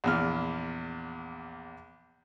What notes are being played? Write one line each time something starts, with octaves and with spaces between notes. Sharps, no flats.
A#1 E2 F6